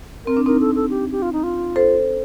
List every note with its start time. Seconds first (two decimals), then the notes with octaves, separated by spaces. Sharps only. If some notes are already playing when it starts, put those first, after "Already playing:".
0.25 C4 A#4
0.37 D4
0.46 C4 D#4 A#4
0.60 A4
0.75 A4
0.90 G4
1.12 G4
1.22 F4
1.33 D#4
1.43 F4
1.76 A4 C5